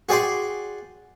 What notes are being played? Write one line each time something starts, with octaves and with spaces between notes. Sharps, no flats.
F#4 G#4 D5 G5 C6